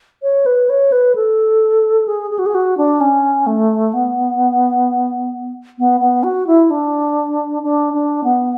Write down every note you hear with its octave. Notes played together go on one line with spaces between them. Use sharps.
C#5
B4
C#5
B4
A4
G#4
G#4
F#4
G#4
F#4
D4
C#4
A3
B3
B3
B3
F#4
E4
D4
D4
D4
B3